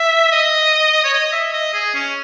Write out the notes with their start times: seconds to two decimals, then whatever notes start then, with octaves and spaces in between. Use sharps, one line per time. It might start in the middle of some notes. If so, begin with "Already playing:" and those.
Already playing: E5
0.32 D#5
1.04 C#5
1.13 D#5
1.33 E5
1.53 D#5
1.74 G#4
1.95 C#4